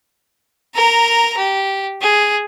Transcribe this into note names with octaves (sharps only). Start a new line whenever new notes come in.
A#4 A#5
G4
G#4